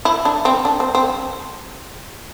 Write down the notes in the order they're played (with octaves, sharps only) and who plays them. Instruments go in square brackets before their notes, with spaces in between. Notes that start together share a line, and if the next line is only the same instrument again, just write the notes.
[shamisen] E4
D4
C4
D4
C4
C4